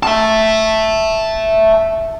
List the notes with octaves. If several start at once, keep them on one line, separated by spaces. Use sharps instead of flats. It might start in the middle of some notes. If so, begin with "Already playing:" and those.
E5 A5